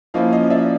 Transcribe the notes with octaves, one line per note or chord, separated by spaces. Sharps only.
F3 A#3 C#4 E4 D#5 F5
D#5 F5
D5 E5